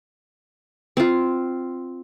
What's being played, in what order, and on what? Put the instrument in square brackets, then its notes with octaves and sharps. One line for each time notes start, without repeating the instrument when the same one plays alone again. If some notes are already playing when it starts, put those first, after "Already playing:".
[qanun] C4 F4